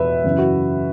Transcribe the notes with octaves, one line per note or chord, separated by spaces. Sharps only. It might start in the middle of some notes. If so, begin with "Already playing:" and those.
Already playing: E2 B2 B4 E5
F#2 C#3 E3
F#4